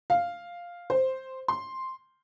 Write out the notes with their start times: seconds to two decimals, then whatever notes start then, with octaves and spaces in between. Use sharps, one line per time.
0.10 F5
0.90 C5
1.48 C6